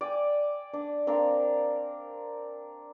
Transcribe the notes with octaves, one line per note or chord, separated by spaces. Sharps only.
D5 G5 G#5
D4
C4 D4 A#4 F5